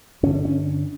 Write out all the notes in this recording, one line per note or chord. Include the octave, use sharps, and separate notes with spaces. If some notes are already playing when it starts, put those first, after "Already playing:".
G2 D3 C#4
C#4